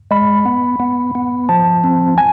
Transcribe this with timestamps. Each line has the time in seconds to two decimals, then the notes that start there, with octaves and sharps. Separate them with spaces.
0.11 G#3 B5
0.46 B3
0.80 B3
1.15 B3
1.49 F3 A5
1.84 C4
2.18 G#5